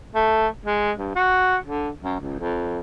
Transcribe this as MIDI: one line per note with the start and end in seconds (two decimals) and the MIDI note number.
0.15 0.48 57
0.66 0.92 56
0.97 1.14 43
1.15 1.57 66
1.66 1.90 50
2.02 2.18 42
2.21 2.36 37
2.40 2.80 41